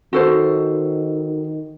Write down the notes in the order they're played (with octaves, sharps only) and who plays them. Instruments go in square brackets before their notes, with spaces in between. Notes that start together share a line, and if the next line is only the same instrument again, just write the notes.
[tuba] D#3 [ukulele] F#4 A4 C5